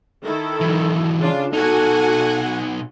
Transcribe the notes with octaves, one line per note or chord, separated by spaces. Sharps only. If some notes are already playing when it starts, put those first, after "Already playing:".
D#3 E4 A4
E3 F#3
C#3 D4 F4
B2 D#4 F#4 A4 F#5 G#5